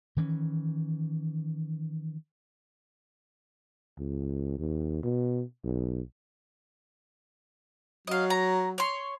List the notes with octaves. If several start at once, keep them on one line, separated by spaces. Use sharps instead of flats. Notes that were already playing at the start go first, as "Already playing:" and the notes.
D#3 E3 C4 C#4
C#2
D#2
B2
B1
F#3 D#5 F5
A#5
C#5 C6